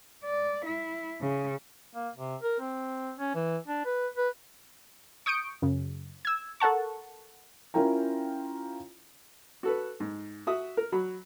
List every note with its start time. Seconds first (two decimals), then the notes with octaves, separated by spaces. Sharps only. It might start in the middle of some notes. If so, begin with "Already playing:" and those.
0.24 D5
0.65 E4
1.21 C#3
1.94 A#3
2.16 C3
2.42 A#4
2.60 C4
3.19 C#4
3.35 E3
3.68 D4
3.85 B4
4.17 B4
5.26 C#6 D#6 G6 C#7 D7
5.62 F#2 C#3
6.25 E6 G#6
6.60 A4 A#4 F#5 A5 C#6
7.74 C#4 E4 F4 A#4 G5 A#5
9.63 F#4 A4 B4
10.00 G#2
10.47 F#4 E5 D#6
10.77 A#4
10.92 F#3 F#4 B5